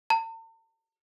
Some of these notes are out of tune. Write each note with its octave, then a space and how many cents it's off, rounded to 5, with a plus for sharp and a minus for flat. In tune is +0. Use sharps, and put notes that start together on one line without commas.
A5 +45